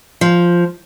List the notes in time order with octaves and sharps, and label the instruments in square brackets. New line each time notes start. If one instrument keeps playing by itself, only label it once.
[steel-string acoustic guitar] F3